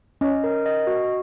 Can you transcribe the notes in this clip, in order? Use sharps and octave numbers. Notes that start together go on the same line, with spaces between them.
C#4 D#5
A#4
D#5
F#4